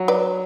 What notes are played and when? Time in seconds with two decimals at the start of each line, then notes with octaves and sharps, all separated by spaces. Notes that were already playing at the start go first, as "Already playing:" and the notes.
Already playing: F#3
0.08 B4 D5